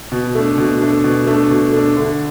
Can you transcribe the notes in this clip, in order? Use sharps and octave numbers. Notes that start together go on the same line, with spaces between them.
B2
A3 D4
B2
A3 D4
B2
A3 D4
B2
A3 D4
D3